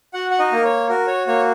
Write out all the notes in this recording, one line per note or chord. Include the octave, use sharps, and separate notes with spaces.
F#4 F#5
F#5
D#4 D#5
A#3 A#4
C#5
F#4 A#4
C#5
A#3 C#5